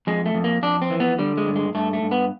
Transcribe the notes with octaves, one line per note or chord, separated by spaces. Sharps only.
F2 G#3
A3
F2
A#3
F2 D4
C4
E3
B3
D3 G3
G#3
G2
G#3
G2 A3
A3
G2
B3